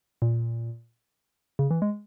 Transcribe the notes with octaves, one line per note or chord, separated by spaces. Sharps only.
A#2
C#3
E3
G#3